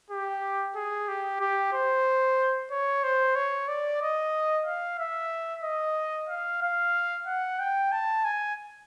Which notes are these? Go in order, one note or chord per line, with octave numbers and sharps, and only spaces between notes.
G4
G#4
G4
G4
C5
C#5
C5
C#5
D5
D#5
F5
E5
D#5
F5
F5
F#5
G5
A5
G#5